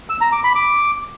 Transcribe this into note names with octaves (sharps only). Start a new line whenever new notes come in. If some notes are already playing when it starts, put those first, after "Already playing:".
E6
A#5
D6
B5
D6